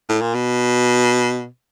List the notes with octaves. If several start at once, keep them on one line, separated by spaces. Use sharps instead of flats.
A2
A#2
B2